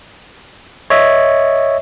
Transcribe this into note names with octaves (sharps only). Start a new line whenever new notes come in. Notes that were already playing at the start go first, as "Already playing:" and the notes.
C#5 D#5 E5